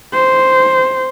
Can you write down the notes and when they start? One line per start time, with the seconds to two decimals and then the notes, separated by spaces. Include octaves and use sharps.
0.13 C5